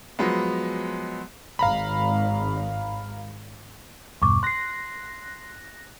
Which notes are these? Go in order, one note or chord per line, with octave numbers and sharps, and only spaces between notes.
F3 F#3 G#3 B3
G#1 F5 A#5 B5
E2 G2 B2 C#6 D6
C6 F#6 A#6 C7